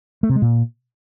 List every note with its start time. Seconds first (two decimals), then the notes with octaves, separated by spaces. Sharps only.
0.23 A3
0.29 C3
0.36 G#3
0.42 A#2